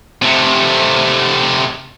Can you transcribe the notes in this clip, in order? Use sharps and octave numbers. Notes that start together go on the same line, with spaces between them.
C3 A3